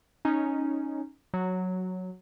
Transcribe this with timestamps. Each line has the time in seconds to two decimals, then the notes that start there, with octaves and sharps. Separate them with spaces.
0.25 C#4 D#4
1.34 F#3